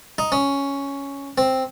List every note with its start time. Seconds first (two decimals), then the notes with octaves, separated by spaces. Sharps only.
0.18 D#4
0.32 C#4
1.38 C4